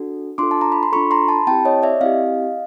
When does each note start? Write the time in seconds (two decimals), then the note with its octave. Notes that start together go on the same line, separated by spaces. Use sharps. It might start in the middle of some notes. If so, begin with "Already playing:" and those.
Already playing: D4 F#4 A4
0.38 D4 F4 A4 C6 D6
0.51 A5
0.61 A#5
0.72 B5
0.83 C6
0.92 D4 F4 A4 B5 C#6
1.11 A#5 C6
1.28 A5 B5
1.47 C4 E4 G4 G5 A5
1.65 C#5 D#5
1.83 D5 E5
2.01 C4 E4 G4 D#5 F5